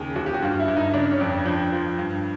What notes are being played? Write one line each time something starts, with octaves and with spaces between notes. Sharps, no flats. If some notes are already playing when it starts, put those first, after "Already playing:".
Already playing: D#2 C#3 G#4
D#2 F#4
G4
F#4
G2 F4
E4
G2
D#4
C#3 D4
C#4
F2 D4
F3 D4
F3
G2